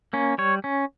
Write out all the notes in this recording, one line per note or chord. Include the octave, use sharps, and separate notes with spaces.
A#3 C#4
G3 C#5
C#4